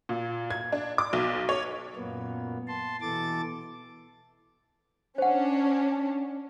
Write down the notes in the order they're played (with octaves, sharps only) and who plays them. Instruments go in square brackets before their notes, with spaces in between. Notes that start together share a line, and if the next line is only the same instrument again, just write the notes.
[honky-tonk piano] A#2
G#6
D4
D6
B1
C#5
[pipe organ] F#2 A#2 A#3 B3
A5 C6
B2 E3 A4 D6 A6
[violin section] C#4 D4 [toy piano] C5 F#5